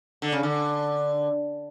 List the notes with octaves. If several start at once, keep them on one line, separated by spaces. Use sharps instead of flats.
D3
C#3
D3